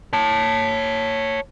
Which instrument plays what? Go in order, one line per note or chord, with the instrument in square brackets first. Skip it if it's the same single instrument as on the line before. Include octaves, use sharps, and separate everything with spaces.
[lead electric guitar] C#5 A5